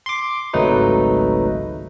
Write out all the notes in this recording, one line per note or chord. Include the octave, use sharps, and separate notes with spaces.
C6 D6
G#1 C#2 F#3 A3 D#4 B4